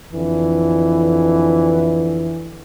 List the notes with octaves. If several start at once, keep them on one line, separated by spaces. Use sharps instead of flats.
F2 D3 E3